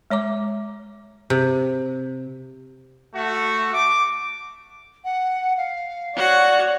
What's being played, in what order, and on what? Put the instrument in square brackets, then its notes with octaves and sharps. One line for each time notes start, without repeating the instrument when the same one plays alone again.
[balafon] G#3 C#5 A#5 D6
[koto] C3
[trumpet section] A3 F#4
D6
[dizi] F#5
F5
[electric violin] F#4 [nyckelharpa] C#5 F#5 [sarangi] D5